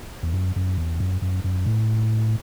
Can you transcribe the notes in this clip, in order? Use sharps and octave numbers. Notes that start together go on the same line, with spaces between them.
E2
F#2
F#2
E2
F#2
F#2
F#2
A2